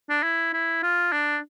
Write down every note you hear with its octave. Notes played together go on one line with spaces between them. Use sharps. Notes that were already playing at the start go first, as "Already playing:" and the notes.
D4
E4
E4
F4
D4